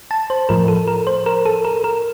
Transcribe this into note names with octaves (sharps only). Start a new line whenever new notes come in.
A5
C5
A2 F3 A#4
A4
A#4
C5
A#4
A4
A#4
A#4